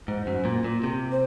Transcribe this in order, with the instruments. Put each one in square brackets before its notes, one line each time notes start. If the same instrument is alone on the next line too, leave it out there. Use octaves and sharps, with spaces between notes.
[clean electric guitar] G#2 [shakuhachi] C5
[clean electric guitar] F#2
A#2
A#2
C3
[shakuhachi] C5